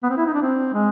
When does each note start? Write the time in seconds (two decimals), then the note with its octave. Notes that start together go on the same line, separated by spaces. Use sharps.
0.03 B3
0.10 C4
0.17 E4
0.26 D#4
0.34 D4
0.42 C4
0.74 G#3